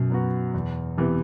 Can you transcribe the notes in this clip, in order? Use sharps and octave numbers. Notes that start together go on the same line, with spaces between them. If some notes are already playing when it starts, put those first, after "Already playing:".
Already playing: F#2 B2
F#3 B3 F#4
E2
C3 E3 B3